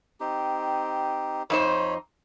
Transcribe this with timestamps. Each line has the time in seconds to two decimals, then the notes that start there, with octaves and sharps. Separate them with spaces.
0.20 C4 D#4 G4
1.50 F2 D#4 C5 C#5 B5